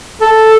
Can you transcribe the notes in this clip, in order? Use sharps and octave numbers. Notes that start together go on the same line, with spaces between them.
A4